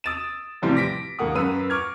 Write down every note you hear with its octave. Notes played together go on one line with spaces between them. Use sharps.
D#6 E6 A6 D7 E7
A2 C3 E3 F3 G3 C4
D6 A#6 B6 D7
D#2 G#2 A#3 F#5 D#6
F#2 F#3 B4 E6 D#7
C#6 D6 F6 G#6